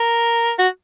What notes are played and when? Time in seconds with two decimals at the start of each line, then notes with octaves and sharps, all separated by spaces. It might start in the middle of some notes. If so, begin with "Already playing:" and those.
Already playing: A#4
0.59 F#4